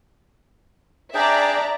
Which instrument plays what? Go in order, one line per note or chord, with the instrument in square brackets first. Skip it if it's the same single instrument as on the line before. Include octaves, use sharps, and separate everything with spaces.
[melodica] D4 G#4 G5 [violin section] D5 E5 A#5